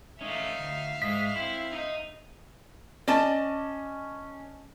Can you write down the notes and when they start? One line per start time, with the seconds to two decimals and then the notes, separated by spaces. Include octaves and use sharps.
0.21 A3 C#4 D#4 E5 F5
0.60 D2
1.02 G#2 G#3 D#5 B6
1.36 C4 E4
1.72 D#4 D#5
3.08 C#4 D5 D#5 A5